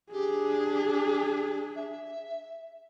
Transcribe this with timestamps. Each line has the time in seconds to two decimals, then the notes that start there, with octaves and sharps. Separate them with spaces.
0.12 D4 G4 G#4
1.76 E5